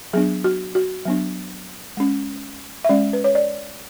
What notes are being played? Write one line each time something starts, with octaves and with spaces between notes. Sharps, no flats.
F#3 B3 D4 G#4
F#4
F#4
F#3 B3 D4
G#3 C#4
E5
G#3 C#4 D5
B4
C#5
D5